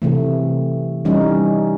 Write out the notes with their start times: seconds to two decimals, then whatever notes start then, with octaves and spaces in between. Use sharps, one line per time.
0.02 C3 E3 A3
1.05 E3 G3 C#4 D#4